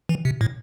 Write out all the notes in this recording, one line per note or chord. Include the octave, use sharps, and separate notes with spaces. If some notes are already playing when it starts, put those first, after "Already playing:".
E3
C3
A2